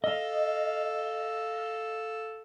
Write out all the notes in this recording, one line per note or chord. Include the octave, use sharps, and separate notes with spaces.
A4 D#5 F5